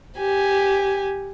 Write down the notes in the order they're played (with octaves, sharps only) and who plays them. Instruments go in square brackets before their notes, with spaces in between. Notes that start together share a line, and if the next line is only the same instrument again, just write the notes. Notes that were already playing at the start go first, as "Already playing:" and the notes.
[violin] G4 G#5